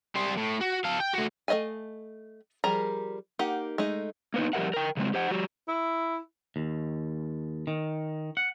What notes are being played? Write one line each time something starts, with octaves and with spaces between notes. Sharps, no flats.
G3 C5
A2
F#4
A4 F5
G5
A3 F#4
A3 B4 D#5 F5 G#5
F3 G3 G#4 A#4 A#5
A#3 D#4 G4 F#5
G#3 A3 D#4
A#3 B3 D#4
F3 G3 G4 A#4 E5 F#5
A#4 G5
C#3 F#3 G#3 C4
G4 C5 F#5
F#3 G4
E4
D#2
D#3
F#5